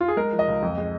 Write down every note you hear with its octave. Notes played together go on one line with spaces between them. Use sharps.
F4
G#4
G#3 A#4
F3
D#5
C#2
F2
G#3